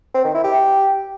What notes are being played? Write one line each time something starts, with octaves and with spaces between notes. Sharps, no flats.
C4
D#3
E4
G4